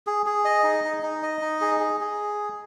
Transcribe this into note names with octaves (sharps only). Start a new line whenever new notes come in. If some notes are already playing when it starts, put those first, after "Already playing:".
G#4
G#4
D#5
D#4
D#4
D#4
D#5
D#4
G#4
G#4
G#4